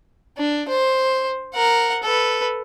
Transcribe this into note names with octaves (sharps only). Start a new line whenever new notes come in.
D4
C5
A#4 F#5
A4 B4